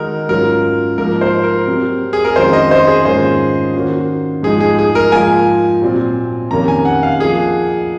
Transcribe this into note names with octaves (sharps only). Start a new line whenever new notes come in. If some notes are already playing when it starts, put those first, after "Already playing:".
Already playing: D#3 G#3 D#4 F#4 A#4
G#2 F#3 C#4 F4 A#4
G#2 F3 A#3 A#4
C5
A#4
C3 F#3 C4
G#4
A#4
F2 D#3 G#3 C#4 F#4 C5
D#5
C5
G#4
G#2 D#3 A#3 C#4 F4 C5
D#3 A#3 C#4 F#4
G#2 F3 G#3 D#4 G#4
G#4
G#4
A#4
G#2 F3 A#3 F4 G#5
A#2 F#3 C4
F2 C3 D#3 A#3 C#4 A#5
G#5
F#5
F5
F3 A#3 G#4